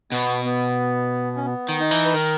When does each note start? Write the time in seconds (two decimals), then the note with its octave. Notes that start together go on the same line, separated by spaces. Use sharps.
0.11 B2 B3
0.45 B3
1.36 C#4
1.46 B3
1.69 D#3
1.80 D#4
1.91 E3
2.05 B4
2.14 D#3 A#4